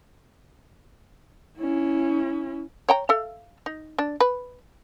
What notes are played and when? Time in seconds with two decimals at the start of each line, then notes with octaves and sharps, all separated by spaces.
1.59 C#4 E4
2.89 C#5 G5 A#5
3.09 A4 E5 F5
3.66 D#4
3.99 D4
4.20 B4